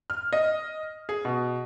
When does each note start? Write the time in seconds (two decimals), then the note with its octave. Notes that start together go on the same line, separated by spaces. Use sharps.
0.10 F6
0.33 D#5
1.09 G#4
1.25 B2